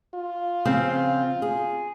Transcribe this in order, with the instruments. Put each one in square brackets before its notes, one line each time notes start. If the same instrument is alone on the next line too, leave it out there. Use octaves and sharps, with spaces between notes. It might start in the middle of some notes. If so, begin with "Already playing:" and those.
[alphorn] F4
[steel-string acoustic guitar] C#3 F3 C4
G#4